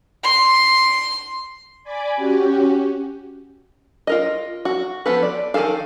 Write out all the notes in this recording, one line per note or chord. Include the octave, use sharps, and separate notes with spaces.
C6
D5 G#5 B5 D6
C#4 F#4 G4
F4 A#4 D#5
F#4
F3 B3 A4 B4
D5
D#3 F3 G#4 A4 F5